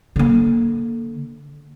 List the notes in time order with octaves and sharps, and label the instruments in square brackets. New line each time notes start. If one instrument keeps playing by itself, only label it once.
[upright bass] D3 A#3